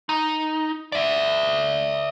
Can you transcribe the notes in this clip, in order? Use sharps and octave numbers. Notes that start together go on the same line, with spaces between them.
D#4
D5 E5